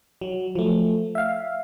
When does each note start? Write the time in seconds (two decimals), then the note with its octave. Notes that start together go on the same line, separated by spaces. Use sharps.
0.21 F#3
0.55 F3 A3
1.15 E5 F5